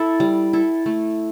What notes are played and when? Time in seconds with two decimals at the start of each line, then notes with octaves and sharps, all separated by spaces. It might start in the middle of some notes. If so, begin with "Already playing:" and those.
Already playing: E4 A4
0.20 G3
0.53 E4 A4
0.86 A3